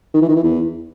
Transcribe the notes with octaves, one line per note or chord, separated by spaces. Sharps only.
D#3
E3
D#3
E3
E2